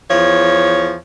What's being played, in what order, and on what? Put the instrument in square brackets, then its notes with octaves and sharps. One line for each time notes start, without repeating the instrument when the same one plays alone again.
[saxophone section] E2 F3 C#5